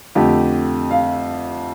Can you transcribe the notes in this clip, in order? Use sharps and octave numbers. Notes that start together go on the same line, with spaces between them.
F2 D3 A3 G4
F5